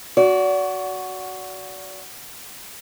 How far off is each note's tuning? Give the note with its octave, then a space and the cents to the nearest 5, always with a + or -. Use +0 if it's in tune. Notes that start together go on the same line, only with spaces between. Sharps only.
F#4 +0 D5 -35